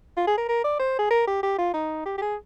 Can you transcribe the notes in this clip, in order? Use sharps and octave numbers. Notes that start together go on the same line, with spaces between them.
F4
G#4
A#4
A#4
D5
C5
G#4
A#4
G4
G4
F4
D#4
G4
G4
G#4